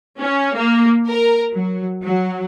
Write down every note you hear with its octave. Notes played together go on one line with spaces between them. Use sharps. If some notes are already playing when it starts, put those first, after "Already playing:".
C#4
A#3
A#4
F#3
F#3